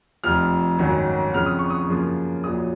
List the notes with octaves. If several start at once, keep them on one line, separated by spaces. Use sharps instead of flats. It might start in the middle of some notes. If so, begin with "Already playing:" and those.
F1 F2 F3 F6
G#1 F#2 D#3 F#3
F2 C#3 F3 B3 F6
D#6
C#6
D#6
F#2 C#3 F3 A#3 F4
A#1 A#2 F#3 D#6